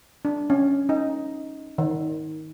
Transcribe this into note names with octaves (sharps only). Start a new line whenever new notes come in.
D4
C#4
D#4
D#3